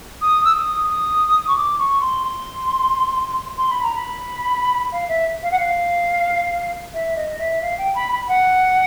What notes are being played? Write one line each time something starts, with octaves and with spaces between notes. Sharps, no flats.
D#6
E6
D#6
D#6
C#6
D6
C#6
C6
C6
C6
B5
A#5
B5
F5
E5
F5
F#5
F5
E5
D#5
E5
F5
G5
B5
B5
F#5